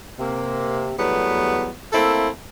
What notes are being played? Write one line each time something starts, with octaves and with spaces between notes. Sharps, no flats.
C3 A#3
E2 F#3 G3 A3 B3
A3 A#3 C4 E4 A4